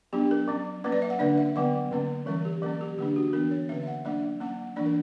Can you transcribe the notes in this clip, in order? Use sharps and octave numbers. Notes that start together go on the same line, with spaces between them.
F#3 B3 D4 G4
A#4
F#3 C#4
F#3 A#3 C#4 B4
D5
E5
F#5
D3 A#3 D4 D5
E5
D3 F#3 B3 F#5
D3 A#3 C#4
E3 G3 C#4 A#4
G4
F#3 A#3 C#4 A#4
G4
D3 A#3 D4 G4
F#4
E3 B3 D4 A#4
C#5
D3 A#3 C#4 E5
E5
F#5
F#3 A#3 D4 E5
F#3 A#3 C#4 F#5
E3 A#3 D4 D5
A#4